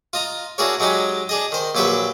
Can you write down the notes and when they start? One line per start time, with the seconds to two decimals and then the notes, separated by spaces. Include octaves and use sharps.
0.13 F4 D#5 A#5
0.58 D4 E4 F#4 G#4 A#4 C#5
0.80 F#3 G#3 D#4 G4
1.29 D4 G#4 D#5
1.52 D#3 C5
1.75 A#1 F#3 G4 B4 E5 G5